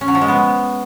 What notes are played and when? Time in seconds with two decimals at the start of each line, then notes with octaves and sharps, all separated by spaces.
0.01 C#4
0.08 F#3
0.15 F3
0.21 G#3
0.28 B3